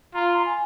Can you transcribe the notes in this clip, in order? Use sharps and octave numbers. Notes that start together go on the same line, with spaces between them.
F4 A#5
C6
A#5
G#5